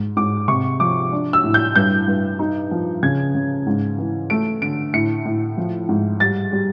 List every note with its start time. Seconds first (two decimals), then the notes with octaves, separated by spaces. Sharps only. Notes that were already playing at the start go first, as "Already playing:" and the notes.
Already playing: G#2
0.17 G#2 D6
0.48 C3 C#6
0.80 F3 D6
1.12 D4
1.33 E6
1.44 A2
1.54 G6
1.76 G2 G6
2.07 G2
2.39 D#4
2.71 F3
3.03 C#3 G#6
3.35 C#3
3.67 G#2
3.98 E3
4.30 A3 D7
4.62 D3 D7
4.94 A2 C#7
5.25 A2
5.57 F3
5.89 G#2
6.20 G3 A6
6.52 G3